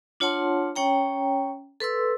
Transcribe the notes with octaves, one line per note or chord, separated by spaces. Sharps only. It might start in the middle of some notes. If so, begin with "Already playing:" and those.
D4 F4 C#5 F#5 A5 C6
C#4 C#5 G5 A#5
A4 B4 C6 E6